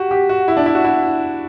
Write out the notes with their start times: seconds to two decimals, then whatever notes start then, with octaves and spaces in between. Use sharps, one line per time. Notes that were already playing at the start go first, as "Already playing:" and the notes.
Already playing: F#4 G4
0.11 G4
0.29 F#4
0.48 E4
0.57 D4
0.66 E4
0.75 F#4
0.84 E4